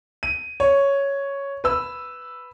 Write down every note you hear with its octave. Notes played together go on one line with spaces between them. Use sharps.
D#7
C#5
B4 E6